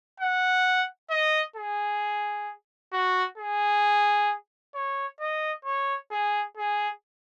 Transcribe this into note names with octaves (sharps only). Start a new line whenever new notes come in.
F#5
D#5
G#4
F#4
G#4
C#5
D#5
C#5
G#4
G#4